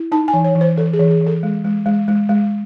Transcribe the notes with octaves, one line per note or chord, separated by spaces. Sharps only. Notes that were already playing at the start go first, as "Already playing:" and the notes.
Already playing: E4
D#4 A5
G#5
E3
C#5
E3
C5
E3 A4
G#4
E3
G#4
E3
A4
G#3
G#3
G#3
G#3
G#3